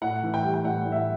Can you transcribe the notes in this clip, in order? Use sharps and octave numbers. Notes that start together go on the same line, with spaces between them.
A2 F#5
E3
G5
G3
G5
A2 F#5
A2
E5
F#5